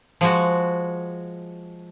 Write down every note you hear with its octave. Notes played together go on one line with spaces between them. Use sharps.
F3 G#3 F#4